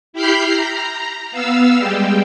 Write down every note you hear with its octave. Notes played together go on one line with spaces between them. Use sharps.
E4 G4 B5 F6 G6 C7
A#5
B3 F5 E6
G3 G#3 G4